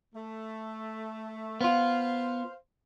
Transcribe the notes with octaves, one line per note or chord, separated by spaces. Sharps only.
A3
B3 F4 C5 F5